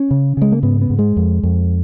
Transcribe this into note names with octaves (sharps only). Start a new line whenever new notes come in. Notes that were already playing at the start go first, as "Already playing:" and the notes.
Already playing: C#4
C#3
C#3 G#3
A#3
G#2 B3
B3
G#2
G#3
F2
F2